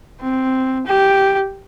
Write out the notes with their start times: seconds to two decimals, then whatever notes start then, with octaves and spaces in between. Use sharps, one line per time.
0.22 C4
0.87 G4